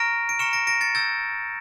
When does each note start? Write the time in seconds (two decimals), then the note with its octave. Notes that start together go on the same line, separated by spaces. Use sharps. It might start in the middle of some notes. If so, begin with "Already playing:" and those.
Already playing: A#5 C#6 F6 A#6 D7
0.29 D7
0.39 A#5 C#6 F6 C#7 E7
0.53 A#6 D7
0.67 A#6 D7
0.81 A6 C#7
0.95 C#6 E6 G6 A6